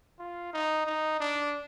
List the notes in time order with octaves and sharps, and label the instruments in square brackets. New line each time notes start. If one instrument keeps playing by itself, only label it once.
[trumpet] F4
D#4
D#4
D4